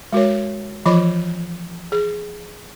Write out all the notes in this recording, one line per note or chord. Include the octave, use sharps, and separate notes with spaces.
G#3 F#4 A#4 C#5
E3 F3 F4 D#5 B5 D6
G#4